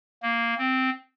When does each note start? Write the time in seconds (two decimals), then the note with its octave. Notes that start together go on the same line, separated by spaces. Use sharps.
0.23 A#3
0.58 C4